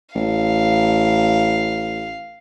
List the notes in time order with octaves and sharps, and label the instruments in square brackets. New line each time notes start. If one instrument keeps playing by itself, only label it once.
[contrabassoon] A1 [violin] F5